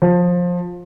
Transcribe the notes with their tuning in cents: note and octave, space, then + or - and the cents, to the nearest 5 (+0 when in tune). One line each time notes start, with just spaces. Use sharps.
F3 +20